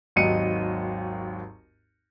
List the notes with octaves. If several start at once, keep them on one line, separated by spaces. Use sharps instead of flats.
G#1 D#2 F#3 D#5 C#7 D#7